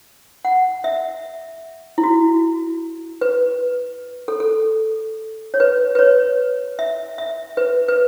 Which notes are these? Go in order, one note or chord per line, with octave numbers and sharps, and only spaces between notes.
F#5
E5
E4
F#4
B4
A4
A4
C#5
B4
B4
C#5
E5
E5
B4
B4